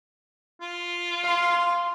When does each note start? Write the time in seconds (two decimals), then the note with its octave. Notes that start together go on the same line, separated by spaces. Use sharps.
0.61 F4
1.23 F5 C6